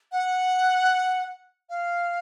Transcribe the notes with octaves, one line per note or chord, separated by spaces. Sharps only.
F#5
F5